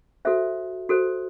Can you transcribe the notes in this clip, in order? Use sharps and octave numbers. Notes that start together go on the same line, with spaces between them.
F#4 A4 C5 E5
F#4 A4 C5